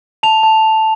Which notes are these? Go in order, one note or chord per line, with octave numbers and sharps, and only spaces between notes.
A5 F7
A5